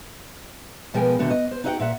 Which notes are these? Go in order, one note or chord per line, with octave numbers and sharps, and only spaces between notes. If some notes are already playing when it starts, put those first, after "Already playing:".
B2 F3 G#3 A#4 G5 G#5
B2 D3 D#3 A3 F#4
D#5
C5
D#4 F#4 G4 D#5 F#5 G5
A#2 E5 F#5